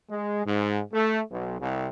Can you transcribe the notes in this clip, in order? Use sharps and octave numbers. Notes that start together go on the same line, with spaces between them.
G#3
G#2
A3
B1
C2